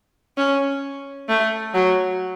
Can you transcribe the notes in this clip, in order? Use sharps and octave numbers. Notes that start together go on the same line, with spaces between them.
C#4
A3
F#3